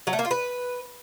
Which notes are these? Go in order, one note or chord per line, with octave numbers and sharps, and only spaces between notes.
F#3
A3
A#3
F4
B4